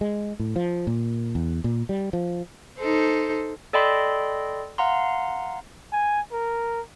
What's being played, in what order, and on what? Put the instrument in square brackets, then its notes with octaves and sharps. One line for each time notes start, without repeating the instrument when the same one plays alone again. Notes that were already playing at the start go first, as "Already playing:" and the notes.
[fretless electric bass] G#3
A2
F3
A#2
E2
A#2
G3
F3
[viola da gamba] D#4 A4 C5
[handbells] A4 D5 D#5 G5 B5 C6
F5 F#5 A#5 C6
[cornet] G#5
A#4